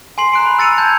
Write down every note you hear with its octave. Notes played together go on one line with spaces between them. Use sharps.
G#5 C6 C7 F#7
A#5 F#6 D7
B5
E6 A6 C#7 D#7 F7
A5 G6 G#6